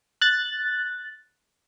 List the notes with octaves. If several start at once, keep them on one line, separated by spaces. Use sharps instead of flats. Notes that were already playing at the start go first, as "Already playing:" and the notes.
F#6 A6